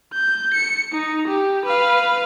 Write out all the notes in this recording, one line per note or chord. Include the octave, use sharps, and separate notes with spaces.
G6
C#7
D#4
G4
B4 F5